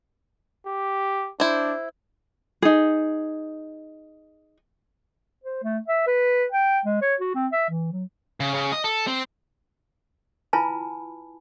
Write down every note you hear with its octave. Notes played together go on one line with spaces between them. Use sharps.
G4
D4 E4 C5
D#4 G#4
C5
A3
E5
B4
G5
G#3
C#5
F#4
C4
E5
E3
F#3
C#3
C#3
D#5
A4
C4
E4 F4 B4 G#5 A5 B5